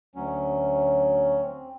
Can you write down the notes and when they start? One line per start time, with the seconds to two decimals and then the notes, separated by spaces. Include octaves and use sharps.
0.15 D2 F#3 C#4
1.41 C4